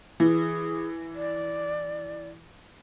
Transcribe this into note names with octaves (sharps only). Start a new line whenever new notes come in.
E3 G#4
D5